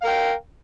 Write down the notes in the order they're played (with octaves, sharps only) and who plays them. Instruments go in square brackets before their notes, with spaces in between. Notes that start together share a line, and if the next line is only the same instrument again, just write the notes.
[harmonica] F5
A#4
G5